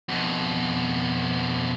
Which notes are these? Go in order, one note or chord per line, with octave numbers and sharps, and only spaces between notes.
F2 B2